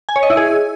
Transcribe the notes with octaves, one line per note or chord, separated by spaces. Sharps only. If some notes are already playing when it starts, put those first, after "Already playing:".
G#5
C#5
D#5
E4
G#4